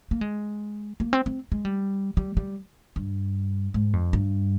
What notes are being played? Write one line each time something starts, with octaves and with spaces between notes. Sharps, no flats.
A#3
G#3
A#3
C4
C4
G#3
G3
G3
G3
G2
G#2
F2
G2